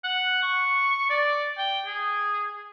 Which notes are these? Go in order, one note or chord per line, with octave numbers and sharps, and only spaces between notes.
F#5
C#6
D5
G5
G#4